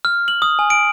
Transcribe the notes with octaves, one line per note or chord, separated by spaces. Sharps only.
F6
F#7
D#6
G#5
D7